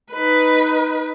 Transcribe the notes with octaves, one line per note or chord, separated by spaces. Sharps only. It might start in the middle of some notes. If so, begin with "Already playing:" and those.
D#4 B4